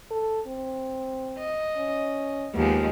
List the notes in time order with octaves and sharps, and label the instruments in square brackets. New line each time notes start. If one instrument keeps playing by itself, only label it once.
[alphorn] A4
C4
[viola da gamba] D#5
[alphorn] C#4
[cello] D#2 [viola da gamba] F3 G#3 [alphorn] B3